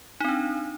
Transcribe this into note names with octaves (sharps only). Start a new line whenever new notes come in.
C4 D4 D#4